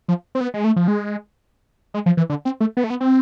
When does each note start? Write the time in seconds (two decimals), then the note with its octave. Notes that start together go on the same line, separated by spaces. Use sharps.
0.08 F3
0.35 C4
0.41 B3
0.54 G#3
0.64 A3
0.76 F3
0.88 G#3
1.94 G#3
2.06 F3
2.17 E3
2.30 D3
2.45 C4
2.60 A3
2.77 B3
2.84 A3
2.90 B3
3.00 C4